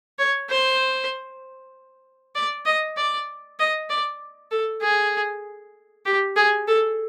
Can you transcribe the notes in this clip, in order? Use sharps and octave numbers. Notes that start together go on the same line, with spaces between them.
C#5
C5
D5
D#5
D5
D#5
D5
A4
G#4
G4
G#4
A4